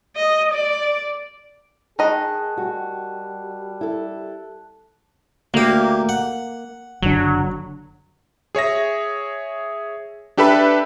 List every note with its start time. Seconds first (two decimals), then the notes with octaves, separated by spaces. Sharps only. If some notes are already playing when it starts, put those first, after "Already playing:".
0.16 D#5
0.54 D5
1.99 D#3 G#4 D#5 A5 F#6
2.57 G3 F#4
3.81 E4 A4
5.54 D2 A#3 G4
6.09 F#5
7.02 F#1 D3 F#3
8.55 G#4 C#5 E5 A#6
10.37 D4 G4 A4 B4 E5 B5